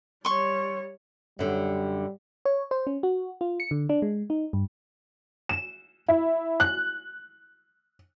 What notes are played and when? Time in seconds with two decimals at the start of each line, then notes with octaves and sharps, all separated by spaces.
0.25 G3 C#5 C6 C#6
1.39 F#2 D3 G3
2.45 C#5
2.71 C5
2.87 C#4
3.03 F#4
3.41 F4
3.60 C#7
3.71 D3
3.89 D4
4.02 G#3
4.30 D#4
4.53 G2
5.49 E7
6.08 E4
6.60 F#6